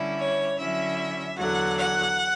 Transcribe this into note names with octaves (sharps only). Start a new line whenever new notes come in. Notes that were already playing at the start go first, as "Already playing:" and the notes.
Already playing: D3 G3 C#4 E4
C#5
D3 F#3 C#4 E4 E5
E2 D3 F#3 F#5
F#5